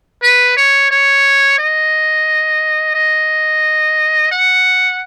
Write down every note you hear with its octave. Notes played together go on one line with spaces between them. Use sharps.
B4
C#5
C#5
D#5
D#5
F#5